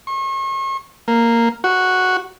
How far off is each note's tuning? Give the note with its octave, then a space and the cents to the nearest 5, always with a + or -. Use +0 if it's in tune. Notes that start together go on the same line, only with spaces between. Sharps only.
C#6 -40
A#3 -5
F#4 -5